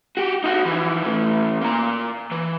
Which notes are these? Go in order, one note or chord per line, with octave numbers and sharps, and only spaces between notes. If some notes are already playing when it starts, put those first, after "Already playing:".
F#4 G4
D#4 F#4
E3 F3
A2 E3
A#2 A#5
E3